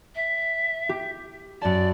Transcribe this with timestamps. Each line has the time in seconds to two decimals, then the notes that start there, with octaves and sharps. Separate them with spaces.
0.15 E5
0.89 G4
1.62 F#2 D5 A5